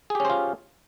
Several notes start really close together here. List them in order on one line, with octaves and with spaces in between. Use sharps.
G#4 G4 C#4 C5 F4